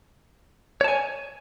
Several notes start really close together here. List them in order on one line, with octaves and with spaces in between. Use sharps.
C#5 A5 G#5